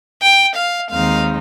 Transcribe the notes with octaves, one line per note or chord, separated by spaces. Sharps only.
G5
F5
D#2 D#3 G#3 C4 D#4 F5